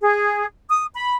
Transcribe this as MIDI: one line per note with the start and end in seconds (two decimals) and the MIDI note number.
0.01 0.44 68
0.70 0.85 87
0.94 1.16 83